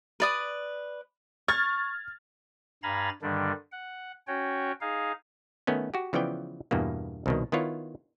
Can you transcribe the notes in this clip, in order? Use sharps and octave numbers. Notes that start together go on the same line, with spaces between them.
B4 D5 D#6
C#6 F6 G#6 A6
G2 F5 G#5 A#5 B5 A6
G2 D3 D#3 G3 D4
F#5
C#4 F#4 C#5 G5
D#4 G#4 F5
D#3 A3 B3 C#4
F#4 G4
C#3 E3 F3 B3 D5 G5
E2 G2 B2 A#3
C2 B2 D#3
D#3 B3 E4 F4 C#5